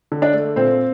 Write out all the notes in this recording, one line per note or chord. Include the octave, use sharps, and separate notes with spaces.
D3
D4 D5
A3
A#2 C4 C5